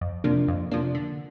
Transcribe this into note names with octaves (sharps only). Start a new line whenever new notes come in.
F2
C3 F3 A#3 D4
F2
C3 F3 A#3 D4
D3